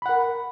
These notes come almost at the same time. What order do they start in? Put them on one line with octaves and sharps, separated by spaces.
B5 F#5 A#4